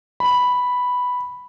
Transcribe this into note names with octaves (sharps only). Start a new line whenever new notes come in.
B5